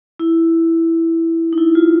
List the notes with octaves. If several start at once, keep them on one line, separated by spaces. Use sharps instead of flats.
E4
D#4
E4
F4